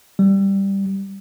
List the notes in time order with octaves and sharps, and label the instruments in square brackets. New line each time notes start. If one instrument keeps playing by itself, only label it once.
[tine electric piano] G3